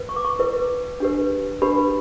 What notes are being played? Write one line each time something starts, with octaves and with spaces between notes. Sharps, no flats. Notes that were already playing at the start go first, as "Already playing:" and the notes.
Already playing: B4
C#6
D6
C#6
E4 B4
D4 G4 B4
D4 G4 B4 B5